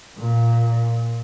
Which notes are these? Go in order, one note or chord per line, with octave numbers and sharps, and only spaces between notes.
A#2